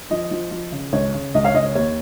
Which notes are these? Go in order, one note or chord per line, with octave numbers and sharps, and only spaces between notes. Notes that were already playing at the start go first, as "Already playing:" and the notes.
F3 D#5
F3
F3
C#3
C#2 C#5
C#3
C#2 D#5
C#5 F5
C#2 D#5
C#5
D#2 C#5